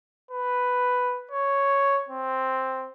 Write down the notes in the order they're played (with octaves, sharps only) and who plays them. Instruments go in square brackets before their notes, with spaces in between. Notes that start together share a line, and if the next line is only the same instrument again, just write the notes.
[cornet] B4
C#5
C4